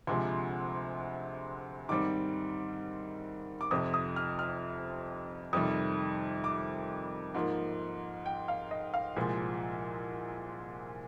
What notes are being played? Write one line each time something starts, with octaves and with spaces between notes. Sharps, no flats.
D2 C3 F3 G#3 C6
G#2 D#3 G3 C4 D6
D6
F2 C3 F3 C4 D#6
D#6
F6
F6
F2 C3 D#3 G3 D#6
D6
G#2 F3 A#3
G5
F5
D#5
F5
C2 A#2 F3 G#3